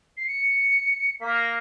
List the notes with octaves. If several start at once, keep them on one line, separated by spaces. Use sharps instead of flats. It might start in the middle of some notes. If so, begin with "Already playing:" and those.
C7
C#7
A#3 B6
A#6